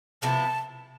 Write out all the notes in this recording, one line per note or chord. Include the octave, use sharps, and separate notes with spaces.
C3 F3 B3 E4 A5